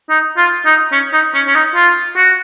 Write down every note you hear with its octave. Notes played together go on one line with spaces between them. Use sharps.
D#4
F4
D#4
C#4
D#4
C#4
C#4
D#4
F4
F#4